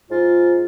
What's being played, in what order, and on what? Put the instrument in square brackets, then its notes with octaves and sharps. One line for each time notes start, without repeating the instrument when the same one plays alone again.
[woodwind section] G#2 F4